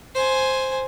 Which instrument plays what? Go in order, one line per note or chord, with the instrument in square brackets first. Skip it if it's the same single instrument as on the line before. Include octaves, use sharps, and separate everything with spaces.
[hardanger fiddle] C5 G#5